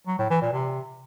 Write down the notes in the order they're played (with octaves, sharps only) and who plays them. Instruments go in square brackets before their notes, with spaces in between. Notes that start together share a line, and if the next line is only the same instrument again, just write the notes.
[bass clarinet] F#3
A2
E3
A#2
C3